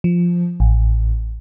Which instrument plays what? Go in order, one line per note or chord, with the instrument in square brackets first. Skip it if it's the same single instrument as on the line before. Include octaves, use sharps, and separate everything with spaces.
[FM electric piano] F3
A1